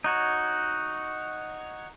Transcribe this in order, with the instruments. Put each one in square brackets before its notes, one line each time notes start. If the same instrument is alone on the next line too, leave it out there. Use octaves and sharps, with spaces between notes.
[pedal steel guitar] D#4 F#4 C#5